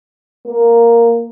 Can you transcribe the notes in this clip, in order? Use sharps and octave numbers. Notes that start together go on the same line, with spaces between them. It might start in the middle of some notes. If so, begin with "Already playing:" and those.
A#3